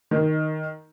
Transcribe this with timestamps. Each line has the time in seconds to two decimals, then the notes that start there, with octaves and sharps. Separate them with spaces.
0.11 D#3